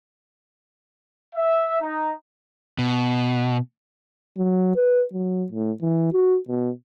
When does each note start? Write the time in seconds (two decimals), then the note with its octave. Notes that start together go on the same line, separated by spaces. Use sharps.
1.36 E5
1.81 D#4
2.79 B2
4.37 F#3
4.76 B4
5.13 F#3
5.52 A2
5.81 E3
6.13 F#4
6.48 B2